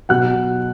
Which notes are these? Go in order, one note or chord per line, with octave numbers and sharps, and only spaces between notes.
B2 F#3 F#5 F#6